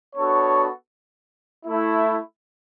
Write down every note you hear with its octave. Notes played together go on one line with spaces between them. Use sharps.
B3 D4 F#4 A4 C#5
A3 E4